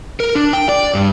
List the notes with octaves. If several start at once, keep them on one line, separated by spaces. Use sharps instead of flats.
A#4
D4
G5
D5
G2